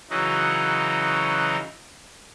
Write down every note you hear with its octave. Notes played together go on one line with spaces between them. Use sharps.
C#3 E3 F#3 D#4 E4 F#4